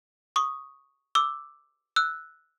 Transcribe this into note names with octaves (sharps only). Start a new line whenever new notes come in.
C#6 D#6
D6 E6
E6 F#6